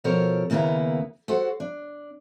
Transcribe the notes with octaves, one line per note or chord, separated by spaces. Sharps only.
B2 F3 A4 A#4 C5 C#5
D#2 C#3 A#3 B3 E4 A#5
F#4 A4 C5 F#5
D4